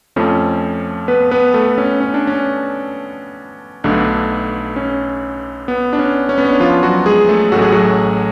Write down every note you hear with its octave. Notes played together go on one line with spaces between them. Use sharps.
F2 F3 A3 C#4
B3 B4
B3 B4
A3 A4
C#4
C#4
D4
C#4
B1 B2 D3 A3 D4
C#4
B3
D4
C#4
C#4
B3
C#4
D4
F3 F4
F#3 F#4
G#3 G#4
A3 A4
A1 A2 F#3 A3 F#4
G#4
F#3 F#4